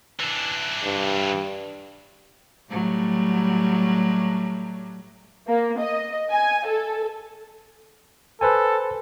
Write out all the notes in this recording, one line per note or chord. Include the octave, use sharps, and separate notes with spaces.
E3 D4
G2
A2 F#3 G3
A#3
D#5
G#5
A4
A4 B4 C5 G#5